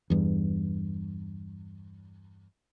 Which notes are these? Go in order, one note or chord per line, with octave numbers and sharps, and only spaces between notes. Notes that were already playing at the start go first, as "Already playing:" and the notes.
E2 G2